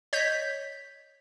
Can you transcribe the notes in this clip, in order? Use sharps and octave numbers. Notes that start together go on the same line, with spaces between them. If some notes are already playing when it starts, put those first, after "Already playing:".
C#5 D#5 G6 B6